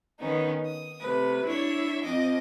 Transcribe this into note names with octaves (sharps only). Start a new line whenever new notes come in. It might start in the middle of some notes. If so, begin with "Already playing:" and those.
D#3 B3 C#4 D#4
D#6
C3 A3 B4
D4 E4 C#5 E5
F2 C4 D#5 D6